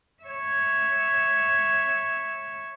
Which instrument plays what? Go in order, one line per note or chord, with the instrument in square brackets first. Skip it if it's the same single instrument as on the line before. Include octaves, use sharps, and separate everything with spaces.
[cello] C#5 E5